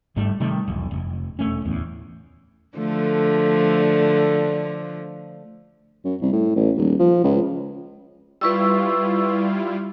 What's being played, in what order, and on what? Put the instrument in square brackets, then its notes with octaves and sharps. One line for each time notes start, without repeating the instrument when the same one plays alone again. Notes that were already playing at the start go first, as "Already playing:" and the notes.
[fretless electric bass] G1 G#2 G3 A3
C3 D#3 G3 A3
E1 B1
F1
E1 A3 C#4
D1 E2
[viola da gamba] D3 F3 A3
[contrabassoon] F#2
C2
A2
A1
D#1
F3
C#2
[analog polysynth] G3 E4 F4 [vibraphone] B4 C#6 E6